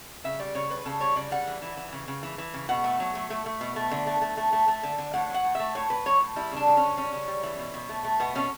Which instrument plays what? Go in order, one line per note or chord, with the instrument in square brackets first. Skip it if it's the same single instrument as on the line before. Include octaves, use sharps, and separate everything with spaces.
[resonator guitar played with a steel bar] C#3 E5
G3 D5
C#3 C#5
G3 B4
C#3 A4
G3 C#5
C#3 D5
G3 F#5
E3
E3
E3
C#3
C#3
E3
E3
C#3
B2 F#5
A3
F#3
A3
A3
A3
B2
A3
D3
A3
A3
A3
A3
A3
D3
D3
A2 F#5
F#3 F#5
A2
A3 E5
A2 C#5
A2 B4
F#3 C#5
A2
G3 E4
C#3 D4
C#3
C#3 C#4
G3 C#4
C#3
G3
E3
B2
B2
A3
A3
B2 B3
B2 C#4